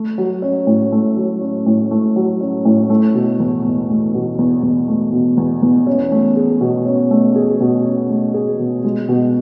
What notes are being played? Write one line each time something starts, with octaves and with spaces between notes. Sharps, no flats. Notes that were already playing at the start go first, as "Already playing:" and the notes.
Already playing: A3
F#3
C#4
A2
A3
F#3
C#4
A2
A3
F#3
C#4
A2
A3
B2
E2
E2
A3
B2
E2
E2
A3
B2
E2
E2
C#4
A3
G#4
B2
C#4
A3
G#4
B2
C#4
A3
G#4
B2
G#3
B2